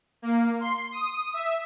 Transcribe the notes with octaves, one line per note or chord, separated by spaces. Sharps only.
A#3
C6
D#6
E5